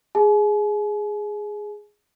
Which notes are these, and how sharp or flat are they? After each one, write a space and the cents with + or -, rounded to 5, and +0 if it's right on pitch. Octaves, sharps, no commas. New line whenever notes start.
G#4 +0 G#5 +40